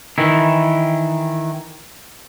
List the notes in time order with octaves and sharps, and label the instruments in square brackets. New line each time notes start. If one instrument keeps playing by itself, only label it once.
[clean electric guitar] D#3 E3 E4